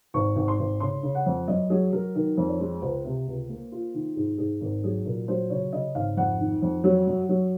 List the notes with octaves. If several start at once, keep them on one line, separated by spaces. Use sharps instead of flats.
G#1 C#6
G#1
C6
G#1
C#3 C6
C#3
F#5
F2
F#2 D#5
F#3 G#4
F#3 A#4
D#3 A#4
F2
C#5
G#3
C#2 C5
C3
C#2
A#3
F4
D#3
G#2 G#4
G#2 G#4
G#1 A#4
F#3 G#4
A#2 A#4
F#3 C5
C#3 C#5
C#3 D#5
G#1 F5
F2 F#5
D#3
F2
F#3
F#2
F#3